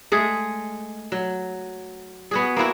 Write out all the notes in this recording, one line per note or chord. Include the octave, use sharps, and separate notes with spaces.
G#3 A3 G#4
F#3
B3 F#4 G#4
A#3 C4 E4 F#4